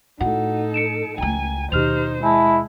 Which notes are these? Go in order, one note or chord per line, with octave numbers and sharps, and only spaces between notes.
A2 D#4 F#4 A4 F#5
C#7 D7 E7
C#2 A3 G5 G#5 A#5
D#2 B2 D#4 G4 C5 F6 F7
G#3 E4 G#5 A5